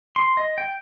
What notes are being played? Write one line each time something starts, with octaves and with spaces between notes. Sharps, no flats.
C6
D#5
G5